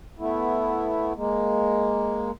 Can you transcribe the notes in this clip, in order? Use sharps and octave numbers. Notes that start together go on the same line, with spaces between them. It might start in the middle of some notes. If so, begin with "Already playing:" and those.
A3 B3 E4
G#3 A#3